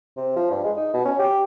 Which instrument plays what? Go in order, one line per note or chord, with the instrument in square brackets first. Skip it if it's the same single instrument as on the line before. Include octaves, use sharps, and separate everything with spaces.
[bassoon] C3
F3
G2
G#3
D#4
B2
C#4
G4